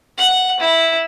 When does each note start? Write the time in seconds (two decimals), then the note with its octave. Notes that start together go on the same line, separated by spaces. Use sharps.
0.18 F#5
0.59 E4